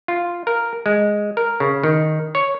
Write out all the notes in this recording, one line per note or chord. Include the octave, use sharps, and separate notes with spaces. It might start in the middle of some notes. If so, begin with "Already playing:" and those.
F4
A#4
G#3
A#4
C#3
D#3
C#5